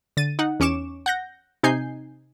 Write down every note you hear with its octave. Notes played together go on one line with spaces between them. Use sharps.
D3 A6 D#7
D#4 F#5
E2 C#4 C#6 D6 E7
F#5 G6 A#6
C3 D#4 G#5 G6 C7